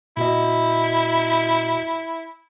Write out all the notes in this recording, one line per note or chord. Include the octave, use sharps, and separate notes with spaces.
A#2 E4 F#4 D#5